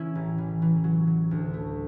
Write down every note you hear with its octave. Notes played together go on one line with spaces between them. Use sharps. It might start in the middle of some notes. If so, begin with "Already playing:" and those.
Already playing: E3 C#4 E4
A1
E3
E3
F#3
F#3
D2
A3